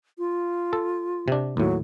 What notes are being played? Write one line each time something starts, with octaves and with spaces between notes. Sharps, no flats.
F4
A4
C3 D4
D#2 A2 F#3